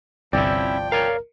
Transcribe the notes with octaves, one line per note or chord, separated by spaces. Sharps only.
G1 C2 F3 C4 C#4 E4 D5 G5
A#4 C#5 D5 F5